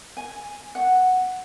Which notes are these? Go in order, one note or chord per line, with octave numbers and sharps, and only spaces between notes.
G#5
F#5